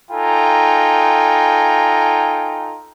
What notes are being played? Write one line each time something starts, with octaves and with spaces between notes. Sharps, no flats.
D#4 F4 A4 G5 G#5 A#5